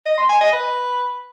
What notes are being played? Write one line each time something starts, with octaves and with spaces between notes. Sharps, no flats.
D#5
C6
G#5
D#5
B4